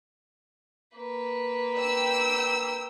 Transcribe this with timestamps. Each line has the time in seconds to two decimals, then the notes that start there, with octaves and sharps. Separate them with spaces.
0.96 A#3 B4
1.78 G5 E6